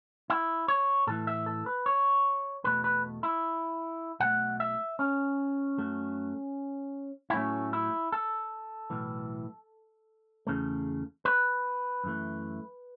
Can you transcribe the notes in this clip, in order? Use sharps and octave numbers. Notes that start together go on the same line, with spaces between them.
E4
C#5
A2 E3 A3 A4
E5
A4
B4
C#5
E2 B2 A3 B4
B4
E4
B1 B2 A3 F#5
E5
C#4
F#2 F#3 A3
E4
A2 F#3 A3 C#4
E4
A4
B1 A2 E3
E2 C#3 A3
B4
F#2 E3 A3